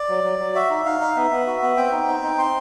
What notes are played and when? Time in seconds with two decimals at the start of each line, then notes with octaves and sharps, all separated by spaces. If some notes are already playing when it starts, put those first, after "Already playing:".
Already playing: D5
0.09 F#3
0.24 F#3
0.39 F#3
0.55 F#4 E5
0.70 D#4
0.86 D#4 F5
1.00 D#4
1.16 B3 E5
1.31 B3
1.46 F#4
1.62 B3
1.77 C4 G5
1.92 D#4
2.08 C4
2.23 D#4
2.38 C4 C6